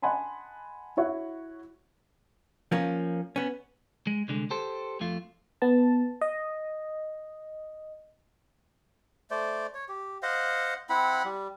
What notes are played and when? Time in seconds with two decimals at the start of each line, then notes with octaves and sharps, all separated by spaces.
0.02 D#5 F#5 G#5 A5 B5 C6
0.97 E4 F#4 C#5 E5 F#5
2.72 F3 A#3 C#4
3.36 B3 C#4
4.07 G#3
4.28 C2 D3 G#3
4.50 G4 A4 C5
5.00 F2 A3 F4
5.62 B3 A5
6.21 D#5
9.31 A3 C5 D5
9.74 C#5
9.89 G4
10.23 C5 D#5 F5 F#5
10.89 C4 E4 F#5 B5
11.25 G3